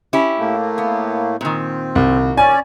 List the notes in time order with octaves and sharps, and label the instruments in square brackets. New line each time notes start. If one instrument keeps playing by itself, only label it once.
[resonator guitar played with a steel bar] C#4 E4 G4
[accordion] A2 A3 A#3
[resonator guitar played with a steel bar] B3
[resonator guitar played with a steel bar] A#2 D#3 [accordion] C4
[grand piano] C2
[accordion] C#4 D5 [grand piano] G#5